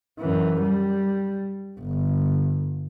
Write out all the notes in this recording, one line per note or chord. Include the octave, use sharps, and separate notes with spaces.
F#2 E3
G3
G1